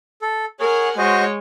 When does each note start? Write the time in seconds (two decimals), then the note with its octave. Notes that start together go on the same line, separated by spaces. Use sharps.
0.22 A4
0.60 G#4 A#4 C#5 F#5 G#5
0.98 G#3 F#4 C5 C#5 D#5